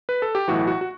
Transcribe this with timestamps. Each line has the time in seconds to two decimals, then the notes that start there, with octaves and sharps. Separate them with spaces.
0.09 B4
0.22 A4
0.35 G4
0.48 B1 A2 E3 F#4
0.67 F#4
0.81 F#4